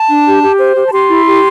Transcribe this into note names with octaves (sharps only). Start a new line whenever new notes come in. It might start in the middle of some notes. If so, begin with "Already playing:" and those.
Already playing: A5
D4
G4
G4
C5
G4
A5
G4 C6
E4
G4